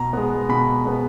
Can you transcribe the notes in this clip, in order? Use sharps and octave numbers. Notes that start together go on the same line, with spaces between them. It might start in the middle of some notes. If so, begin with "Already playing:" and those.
Already playing: B2 A#5
G#3 B3
B2 B5
G#3 B3